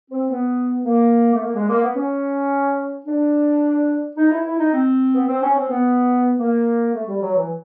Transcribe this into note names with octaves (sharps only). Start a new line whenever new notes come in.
C4
B3
A#3
A3
A#3
G#3
A#3
B3
C#4
D4
D#4
E4
E4
D#4
C4
B3
C4
C#4
C4
B3
A#3
A3
G3
F#3
E3